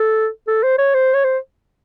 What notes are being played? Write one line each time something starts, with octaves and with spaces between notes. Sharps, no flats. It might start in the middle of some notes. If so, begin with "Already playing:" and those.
Already playing: A4
A4
C5
C#5
C5
C#5
C5